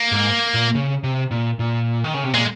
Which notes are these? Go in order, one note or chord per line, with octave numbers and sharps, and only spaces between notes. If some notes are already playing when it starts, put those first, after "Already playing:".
Already playing: A#3
G#2
A#2
C#3
C3
A#2
A#2
D#3
C#3
C3
A#2 G#3